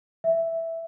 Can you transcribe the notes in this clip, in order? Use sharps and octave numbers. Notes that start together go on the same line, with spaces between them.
E5